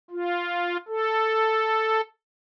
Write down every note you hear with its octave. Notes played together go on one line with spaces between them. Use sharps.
F4
A4